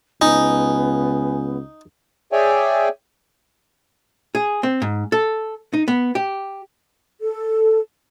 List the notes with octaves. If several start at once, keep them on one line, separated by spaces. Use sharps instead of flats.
C#2 B3 D#4 G#5
G#4 C#5 D5 E5 G5 G#5
G#4
C4
G#2
A4
D#4
B3
G4
A4